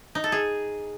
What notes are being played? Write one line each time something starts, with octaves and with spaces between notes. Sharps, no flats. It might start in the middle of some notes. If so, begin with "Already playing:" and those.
D#4
A4
G#4